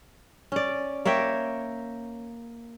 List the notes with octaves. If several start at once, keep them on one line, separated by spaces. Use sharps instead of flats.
C#4 D5
A#3 C#5 E5 G5